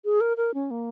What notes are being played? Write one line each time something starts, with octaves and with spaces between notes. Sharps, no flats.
G#4
A#4
A#4
C#4
A#3